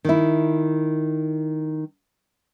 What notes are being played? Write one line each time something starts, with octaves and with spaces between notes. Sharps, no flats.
D#3 E4